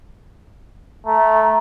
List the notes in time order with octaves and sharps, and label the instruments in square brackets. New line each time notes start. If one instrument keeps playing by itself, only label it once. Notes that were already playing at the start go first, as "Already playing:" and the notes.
[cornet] A3 [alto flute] A#5